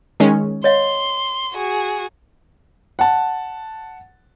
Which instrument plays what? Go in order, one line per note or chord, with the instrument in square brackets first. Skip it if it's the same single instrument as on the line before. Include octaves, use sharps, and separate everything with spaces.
[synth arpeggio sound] D#3 G#3 C#4
[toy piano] C#5 D#5 F5 [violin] C6
[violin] F#4 G#4
[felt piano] F#5 A5